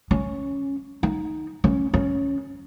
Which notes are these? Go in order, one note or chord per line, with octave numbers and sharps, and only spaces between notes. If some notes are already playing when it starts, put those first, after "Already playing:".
C#4
D#4
C#4
C#4